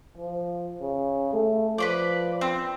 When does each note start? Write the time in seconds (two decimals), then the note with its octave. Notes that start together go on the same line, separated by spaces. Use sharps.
0.18 F3
0.81 C#3
1.33 A3
1.78 F3 B4 C5 D5
2.41 C4